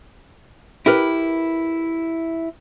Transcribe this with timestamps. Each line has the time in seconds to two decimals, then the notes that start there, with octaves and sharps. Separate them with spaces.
0.86 E4 G4 A#4 B4